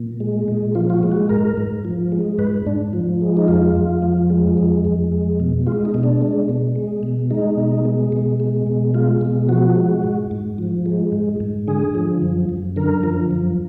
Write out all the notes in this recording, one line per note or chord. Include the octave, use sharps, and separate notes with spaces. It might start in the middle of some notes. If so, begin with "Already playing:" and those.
Already playing: A#2
G#3
A#2
F3 F4
F4
F#4
G#3
F#4
G#2 A#4
G#2
F3
G#3
G#2 B4
G#2 D4
F3
G#3
D#4
F2 F4
F2
F3
G#3
F2
F2
G#3
B2
G#3 F4
D#4
B2
D4
G#3
B2
G#3
B2
G#3 D#4
B2
G#3
B2
G#3
B2
G#3 F4
B2
F3 F#4
G#3
G#2
G#2
F3
G#3
G#2
G#2
D3 G#4
F3
F#2
F#2
D3 A#4
F3
F#2